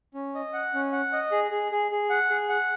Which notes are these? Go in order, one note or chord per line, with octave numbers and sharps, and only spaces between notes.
C#4
D#5
F#5
C#4
F#5
D#5
G#4
G#4
G#4
G#4
F#5
G#4
F#5